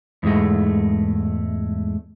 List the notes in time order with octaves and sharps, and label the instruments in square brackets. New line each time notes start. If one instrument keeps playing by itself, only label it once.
[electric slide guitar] E2 G#2 G#3 A3